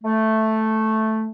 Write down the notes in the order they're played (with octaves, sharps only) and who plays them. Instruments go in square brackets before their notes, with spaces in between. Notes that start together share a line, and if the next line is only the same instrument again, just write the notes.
[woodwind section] A3